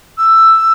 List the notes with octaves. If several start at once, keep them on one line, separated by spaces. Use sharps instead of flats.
E6